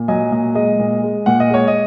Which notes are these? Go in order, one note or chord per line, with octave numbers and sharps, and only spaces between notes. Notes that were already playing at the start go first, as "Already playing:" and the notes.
Already playing: A#2
F#3 D#5 G#5
A#2 D#5
G#3 D#5
A#2
G#3
A#2 F#5
D#5
G#3 C#5
D#5